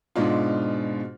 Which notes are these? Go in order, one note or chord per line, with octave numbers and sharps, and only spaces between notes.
G#2 B2 G#3 D4 F4